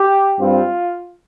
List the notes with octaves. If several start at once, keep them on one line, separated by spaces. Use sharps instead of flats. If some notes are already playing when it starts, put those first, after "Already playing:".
Already playing: G4
G2 G3 C4 F4